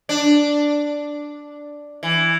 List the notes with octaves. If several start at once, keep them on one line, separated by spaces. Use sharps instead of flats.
D4
E3